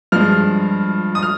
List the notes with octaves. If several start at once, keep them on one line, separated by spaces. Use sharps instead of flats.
G2 F3 G#3 F6
D#6
F6